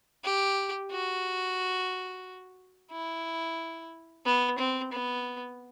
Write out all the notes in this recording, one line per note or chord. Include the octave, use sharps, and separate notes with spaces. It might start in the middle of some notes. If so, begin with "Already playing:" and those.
G4
F#4
E4
B3
C4
B3